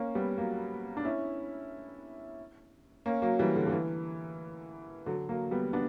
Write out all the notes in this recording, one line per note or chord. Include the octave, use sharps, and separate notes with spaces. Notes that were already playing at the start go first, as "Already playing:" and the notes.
Already playing: A#3 C#4
G3 B3
F#3 A#3
D4
C#4 E4
A#3 C#4
F#3 A#3
E3 G3
D3
D3
E3
D3 F#3
F#3 A#3
G3 B3
B3 D4